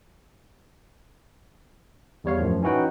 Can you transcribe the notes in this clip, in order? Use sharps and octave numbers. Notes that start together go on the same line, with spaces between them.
E2 G3 C#5 F5
F#2 A2 F3
E3 C#4 D#4 F#4 B4 G5